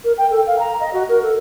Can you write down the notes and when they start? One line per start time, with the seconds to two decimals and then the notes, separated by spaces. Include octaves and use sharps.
0.04 A#4
0.18 G5
0.31 A4
0.47 F5
0.59 A#5
0.80 D#5
0.93 F#4
1.09 A#4
1.23 A4